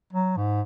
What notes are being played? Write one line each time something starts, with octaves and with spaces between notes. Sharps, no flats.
F#3
G#2